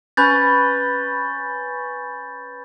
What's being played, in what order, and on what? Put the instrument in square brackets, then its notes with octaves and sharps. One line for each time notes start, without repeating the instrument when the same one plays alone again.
[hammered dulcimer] C#4 B4 [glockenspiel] B5 G6 A6